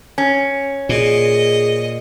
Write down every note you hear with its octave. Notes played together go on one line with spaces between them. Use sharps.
C#4
A#2 G#4 D#5